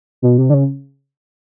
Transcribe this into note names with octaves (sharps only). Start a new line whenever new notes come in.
B2
C3
D3
C#3